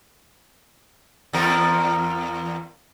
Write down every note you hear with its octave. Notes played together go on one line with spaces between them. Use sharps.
E2 F3 A#4